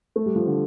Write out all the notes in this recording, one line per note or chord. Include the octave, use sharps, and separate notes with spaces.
A3
G3
F3
D3